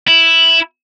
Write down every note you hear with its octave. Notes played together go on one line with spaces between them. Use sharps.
E4